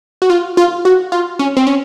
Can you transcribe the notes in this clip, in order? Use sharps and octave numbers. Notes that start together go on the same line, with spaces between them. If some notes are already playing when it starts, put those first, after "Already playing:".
F#4
F4
F4
F#4
F4
C#4
C4
C#4